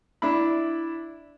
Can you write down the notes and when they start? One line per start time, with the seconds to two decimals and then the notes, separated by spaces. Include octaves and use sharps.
0.22 D4 E4 B5